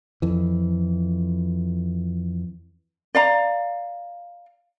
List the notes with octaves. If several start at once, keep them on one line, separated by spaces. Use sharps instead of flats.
F2 E3
D5 F5 A#5